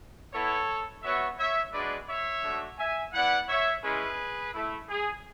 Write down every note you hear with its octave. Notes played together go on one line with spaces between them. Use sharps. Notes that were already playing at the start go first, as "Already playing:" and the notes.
B3 E4 A4 C#5
B3 F#4 C#5 E5
C#5 E5
G#3 D4 F#4 B4 D5
C#5 E5
A3 D4 F#4
E5 G#5
B3 E4 D5 F#5
C#5 E5
G#3 C#4 E4 G#4 B4
A3 E4
G#4